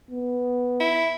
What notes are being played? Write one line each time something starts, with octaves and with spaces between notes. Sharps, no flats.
B3
E4